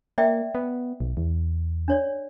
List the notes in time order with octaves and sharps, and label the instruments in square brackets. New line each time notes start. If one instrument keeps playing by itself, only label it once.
[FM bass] A#3 [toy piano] D5 E5 G5
[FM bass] B3
B1
E2
[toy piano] D4 C#5 D5